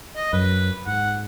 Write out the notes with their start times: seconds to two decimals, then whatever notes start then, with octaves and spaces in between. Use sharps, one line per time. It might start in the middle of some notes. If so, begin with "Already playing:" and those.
0.16 D#5
0.33 F#2 B4
0.87 G#2 F#5